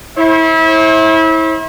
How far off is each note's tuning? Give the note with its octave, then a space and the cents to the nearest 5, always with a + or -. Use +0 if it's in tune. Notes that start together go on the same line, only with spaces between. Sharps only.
E4 -30 C5 +45